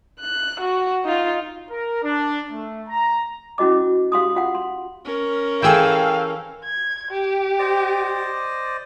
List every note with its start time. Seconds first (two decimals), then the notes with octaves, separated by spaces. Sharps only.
0.20 F#6
0.61 F#4
1.04 D#4 F4
1.70 A#4
2.03 D4
2.51 A3
2.88 A#5
3.58 C#4 E4 F#4 D#5 D6
4.12 G4 F5 C6 D#6
4.35 F4 F5 F#5
4.55 C6
5.05 C#4 A#4
5.62 E3 G#4 A4 F5 G5 G#5 E6
6.64 G#6
7.11 G4
7.59 C5 D5 D#5